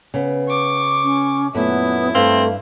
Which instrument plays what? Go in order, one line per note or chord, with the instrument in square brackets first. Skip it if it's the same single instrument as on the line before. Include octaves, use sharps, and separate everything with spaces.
[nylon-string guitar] C#3 B3
[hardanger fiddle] C#6 D6
[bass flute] C#4
[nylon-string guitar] F#2 A#2 A3 [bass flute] B3 [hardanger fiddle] E4
[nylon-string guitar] G2 B4 F5 [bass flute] A3 [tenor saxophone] C4